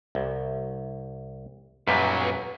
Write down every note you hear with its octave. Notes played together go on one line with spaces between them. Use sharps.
C2
B1 F#2 A#2 F#3 G3 B4